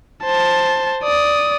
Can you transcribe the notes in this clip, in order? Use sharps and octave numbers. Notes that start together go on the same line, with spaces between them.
C5 A5
D5 D#6